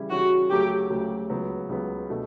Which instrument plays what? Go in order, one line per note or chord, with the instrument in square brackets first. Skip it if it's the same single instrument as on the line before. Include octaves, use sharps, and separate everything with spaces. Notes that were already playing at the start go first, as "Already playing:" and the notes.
Already playing: [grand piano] C#3 E3 G3 C#4 E4
[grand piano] C#3 E3 G3 C#4 E4 [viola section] F#4
[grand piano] D2 C#3 F#3 A3 [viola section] G4
[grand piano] D2 C#3 F#3 A3
C#2 C#3 F#3 B3
C#2 C#3 F#3 B3
B2 A3 D4